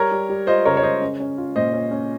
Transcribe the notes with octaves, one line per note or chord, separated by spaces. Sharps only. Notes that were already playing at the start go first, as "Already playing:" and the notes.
Already playing: G3 A#4 C#5
G3
G3
F4 C5 D#5
C#3 A#4 C#5
C#5
C#3 C5 D#5
C#4
C#4
F4
A#2 C5 D#5
C#4
C#4